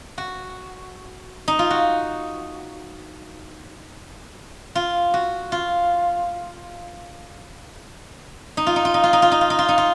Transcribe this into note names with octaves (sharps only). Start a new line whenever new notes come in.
F#4
D#4
F4
F#4
F4
F#4
F4
D#4
F4
D#4
F4
D#4
F4
D#4
F4
D#4
F4
D#4
F4
D#4
F4